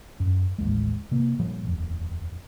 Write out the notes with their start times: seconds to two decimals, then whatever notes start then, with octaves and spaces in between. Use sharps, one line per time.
0.20 F#2
0.58 A1 D#2 G#3
1.11 C3 A#3
1.39 A#2 F3 G3
1.65 D#1 F2